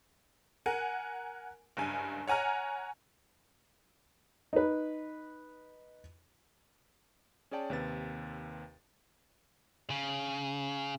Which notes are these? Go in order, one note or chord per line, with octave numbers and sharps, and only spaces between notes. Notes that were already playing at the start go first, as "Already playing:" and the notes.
A#4 F#5 G#5
F#1 G2 G#5
C#5 F#5 G#5 A#5 F6
D#4 B4
C#4 G#4 C#5 D5 G5 A5
D#2 C3 B4 A6
C#3